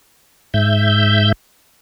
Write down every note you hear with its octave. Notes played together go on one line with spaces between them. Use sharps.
G#2 E5 G6